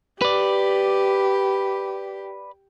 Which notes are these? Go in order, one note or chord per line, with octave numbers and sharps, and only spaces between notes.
G4 B4 D5